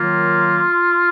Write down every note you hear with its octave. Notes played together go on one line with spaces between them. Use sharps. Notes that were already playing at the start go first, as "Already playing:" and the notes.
Already playing: D#3 F#3 A#3 F4